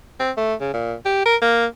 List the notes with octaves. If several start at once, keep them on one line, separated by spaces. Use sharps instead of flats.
C4
A3
C#3
A#2
G4
A#4
A#3